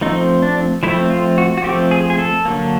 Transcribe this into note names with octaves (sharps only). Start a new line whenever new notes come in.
F3 A3 C4 D#4
D4
F3 A3 C4 E4
F4
F#4
F#4
F3 A3 C4 G4
G#4
G#4
A4
D3 F#3 A#3